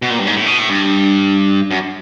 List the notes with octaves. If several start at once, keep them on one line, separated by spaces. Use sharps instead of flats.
B2
A#2
G2
G#2
A2
B2
A2
G2
F#2